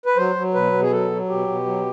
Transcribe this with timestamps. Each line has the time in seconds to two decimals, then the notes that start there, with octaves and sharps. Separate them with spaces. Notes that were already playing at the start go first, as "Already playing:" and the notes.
0.06 B4
0.17 F#3 C5
0.36 F#3
0.54 B2 B4
0.73 B2
0.82 G#4
0.91 F#3 A4
1.10 F#3
1.29 B2 G4
1.47 B2
1.66 F#3